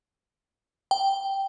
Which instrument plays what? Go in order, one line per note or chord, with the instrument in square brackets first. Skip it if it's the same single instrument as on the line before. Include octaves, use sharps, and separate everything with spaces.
[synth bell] G5